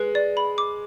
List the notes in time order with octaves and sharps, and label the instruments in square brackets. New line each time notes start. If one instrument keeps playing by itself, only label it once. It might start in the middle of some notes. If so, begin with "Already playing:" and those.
Already playing: [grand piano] G#3 [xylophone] B4
[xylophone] D5
B5
D6